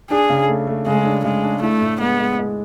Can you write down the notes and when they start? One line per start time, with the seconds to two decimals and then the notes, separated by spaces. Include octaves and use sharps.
0.10 D4 G#4
0.29 C#3
0.48 A3
0.67 A3
0.86 C#3 G#3
1.06 D4
1.24 C#3 G#3
1.44 D4
1.62 A3 E4
1.81 A2
2.00 G#3 B3
2.20 G#3
2.39 G#3